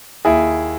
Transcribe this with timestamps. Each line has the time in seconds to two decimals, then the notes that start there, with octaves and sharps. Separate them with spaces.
0.25 D#2 E4 G#4